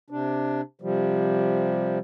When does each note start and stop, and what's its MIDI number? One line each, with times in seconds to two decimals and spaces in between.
0.10 0.61 48
0.10 0.61 62
0.82 1.99 48
0.82 1.99 53
0.82 1.99 55